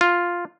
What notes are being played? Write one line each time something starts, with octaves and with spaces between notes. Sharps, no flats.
F4